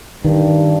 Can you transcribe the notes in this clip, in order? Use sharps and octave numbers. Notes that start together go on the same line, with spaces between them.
G2 D#3